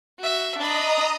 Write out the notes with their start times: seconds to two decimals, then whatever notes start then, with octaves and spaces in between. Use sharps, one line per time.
0.19 F#4 E5
0.58 D4 D#5 A#5 B5 D#6